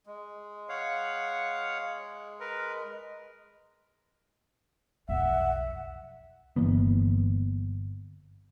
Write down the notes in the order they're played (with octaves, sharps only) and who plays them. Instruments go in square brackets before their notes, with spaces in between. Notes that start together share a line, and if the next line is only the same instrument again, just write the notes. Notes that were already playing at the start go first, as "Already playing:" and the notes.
[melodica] G#3
[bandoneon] C#5 F5 F#5
A#4 B4
[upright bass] B1 F2 [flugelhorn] E5 [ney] F#5
[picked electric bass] G1 E3 A#3 B3